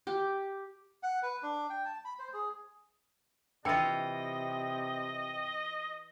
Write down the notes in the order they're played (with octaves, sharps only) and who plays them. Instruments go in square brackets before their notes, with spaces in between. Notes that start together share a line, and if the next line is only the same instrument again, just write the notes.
[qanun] G4
[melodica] F#5
B4
D4
G5
A5
B5
C5
G#4
[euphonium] C3 [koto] E3 F4 [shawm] D#5 [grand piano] G5 E6 C#7